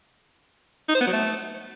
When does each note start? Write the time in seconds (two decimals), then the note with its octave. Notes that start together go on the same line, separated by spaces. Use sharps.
0.89 D#4
0.95 C5
1.01 B3
1.07 F#3
1.13 A3